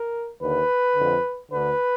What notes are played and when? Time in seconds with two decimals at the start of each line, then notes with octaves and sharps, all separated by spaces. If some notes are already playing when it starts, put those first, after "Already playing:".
Already playing: A#4
0.40 D#2 D3 B4
0.96 F2 D3
1.51 D2 D3 B4